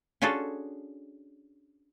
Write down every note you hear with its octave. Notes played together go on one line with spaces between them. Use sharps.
C#4 D4 F4 F#4 G#4 A4